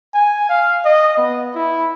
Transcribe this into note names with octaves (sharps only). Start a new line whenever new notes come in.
G#5
F5
D#5
B3
E4